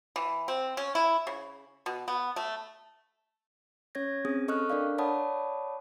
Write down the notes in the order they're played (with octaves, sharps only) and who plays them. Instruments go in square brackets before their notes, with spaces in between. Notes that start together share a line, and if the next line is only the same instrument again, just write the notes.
[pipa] E3
C4
C#4
E4
C#3
B2
B3
A3
[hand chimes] C#4 C#5 G#6 A#6
C4 C#4 G#4 D#6
A4 D#5 C#6 D#6 F6 F#6
D4 A#4 D5 F5
C#5 D5 F#5 A5 B5 D#6